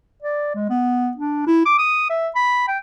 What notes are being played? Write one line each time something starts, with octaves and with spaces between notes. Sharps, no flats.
D5
G#3
B3
D4
E4
D6
D#6
E5
B5
G5